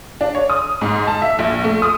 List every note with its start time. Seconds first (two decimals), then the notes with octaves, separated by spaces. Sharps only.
0.21 D4
0.35 C#5
0.50 D#6
0.81 G#2
1.07 A5
1.22 E5
1.39 A#1
1.64 A3
1.82 D#6